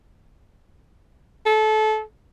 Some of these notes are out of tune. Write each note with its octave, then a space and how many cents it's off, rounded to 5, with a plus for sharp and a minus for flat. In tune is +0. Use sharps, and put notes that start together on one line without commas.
A4 -25